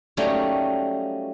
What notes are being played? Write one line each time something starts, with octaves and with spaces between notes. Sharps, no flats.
F#3 G3 A3 A#3 C#4 D#4